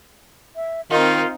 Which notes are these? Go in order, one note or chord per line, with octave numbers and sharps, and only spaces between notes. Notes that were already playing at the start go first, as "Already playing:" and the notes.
E5
D#3 C4 D#4 F4 A#4